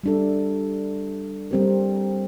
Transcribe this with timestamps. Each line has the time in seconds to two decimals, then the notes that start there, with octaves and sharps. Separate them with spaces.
0.04 G3 D4 A4
1.51 G3 C4 G4 A#4